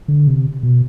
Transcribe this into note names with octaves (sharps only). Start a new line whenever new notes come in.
D3
C3
B2